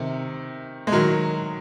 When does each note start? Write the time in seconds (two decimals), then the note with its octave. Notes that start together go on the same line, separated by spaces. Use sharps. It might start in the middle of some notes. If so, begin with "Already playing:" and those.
Already playing: C3 D#3
0.87 G#3
0.92 D#3 F#3